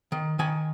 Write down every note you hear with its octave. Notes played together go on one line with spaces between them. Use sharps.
D#3
D#3 G#5